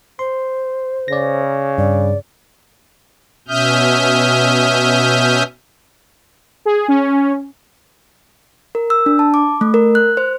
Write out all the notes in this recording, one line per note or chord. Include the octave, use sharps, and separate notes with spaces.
C5 C6
C#3 D5 A#6
G2 D5
B2 C#4 E5 D#6 F6 G6
G#4
C#4
A#4
E6
D4
A5
D6
A3
A#4
F#6
C5